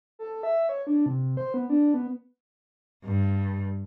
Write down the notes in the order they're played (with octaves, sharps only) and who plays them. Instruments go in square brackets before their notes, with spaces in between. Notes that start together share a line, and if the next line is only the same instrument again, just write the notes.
[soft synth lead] A4
E5
C#5
D4
C3
C5
B3
D4
B3
[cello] G2